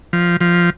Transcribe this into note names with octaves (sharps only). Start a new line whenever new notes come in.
F3
F3